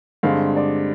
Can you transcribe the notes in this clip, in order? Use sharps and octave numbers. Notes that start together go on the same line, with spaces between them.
G2 D3 G#3 C4 F5
D5